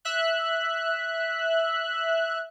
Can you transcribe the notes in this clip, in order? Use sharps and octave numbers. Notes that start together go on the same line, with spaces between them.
E5 F#6